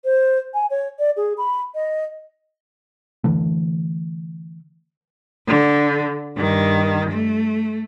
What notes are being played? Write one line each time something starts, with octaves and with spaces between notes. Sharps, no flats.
C5
G#5
C#5
D5
G#4
B5
D#5
D3 E3 A3
D3
G2 D#3
A3